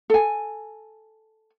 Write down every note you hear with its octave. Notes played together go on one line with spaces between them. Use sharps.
A4 G#5